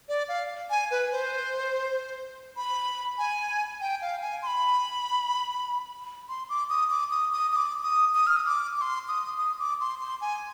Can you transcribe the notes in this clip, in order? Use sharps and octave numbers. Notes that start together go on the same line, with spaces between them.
D5
F5
G#5
B4
C5
B5
G#5
G5
F5
G#5
C6
B5
C6
D6
D#6
D6
D#6
D#6
D#6
D6
D#6
D#6
F6
D#6
D6
D6
C6
D#6
D#6
D6
C6
C6
G#5